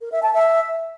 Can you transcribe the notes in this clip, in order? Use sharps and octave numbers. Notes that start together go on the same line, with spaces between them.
A#4
E5
A5
E5